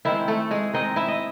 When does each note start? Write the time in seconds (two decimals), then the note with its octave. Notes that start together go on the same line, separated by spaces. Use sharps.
0.05 D#3 G#3 C4 E4 E5
0.28 A3 A4
0.51 G#3 G#4
0.73 D#3 G#3 C4 D#4 D#5
0.96 E4 E5
1.08 D#5